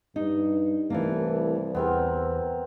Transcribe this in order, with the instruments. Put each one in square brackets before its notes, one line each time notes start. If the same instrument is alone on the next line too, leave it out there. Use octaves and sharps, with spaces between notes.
[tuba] G2 [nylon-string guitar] D#4
[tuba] C2 [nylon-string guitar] E3 A3 A#3
[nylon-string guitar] E2 [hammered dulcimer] B3 C4 A#4